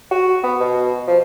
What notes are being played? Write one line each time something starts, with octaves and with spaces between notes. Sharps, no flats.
F#4
B3
B2
F3